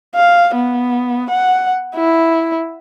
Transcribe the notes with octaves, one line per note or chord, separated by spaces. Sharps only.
F5
B3
F#5
E4